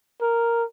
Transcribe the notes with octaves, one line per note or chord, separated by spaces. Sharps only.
A#4